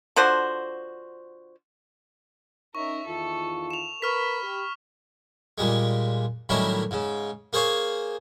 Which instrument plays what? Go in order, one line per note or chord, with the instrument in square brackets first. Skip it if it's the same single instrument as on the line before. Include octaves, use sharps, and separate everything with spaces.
[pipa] D3 F3 F#4 C5
[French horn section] C#4 D#4 [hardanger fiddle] A#4 E5 [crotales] C#6
[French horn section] E2 D#3 F4 [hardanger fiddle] A4
[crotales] E7 F7
[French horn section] A#4 B4 [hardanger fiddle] B5 [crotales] C#6 F6 B6
[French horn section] G4
[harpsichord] A#2 G3 G#3
A2 D#3 F#3 G3 C#4 E4
G#2 C#3
A#3 G#4 C5 C#5 F5